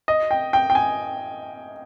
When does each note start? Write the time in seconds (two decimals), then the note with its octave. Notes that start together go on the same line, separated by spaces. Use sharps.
0.08 D#5
0.31 G5
0.53 G5
0.70 G5
0.75 G#5